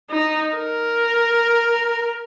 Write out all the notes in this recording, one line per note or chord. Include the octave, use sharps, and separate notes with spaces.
D#4
A#4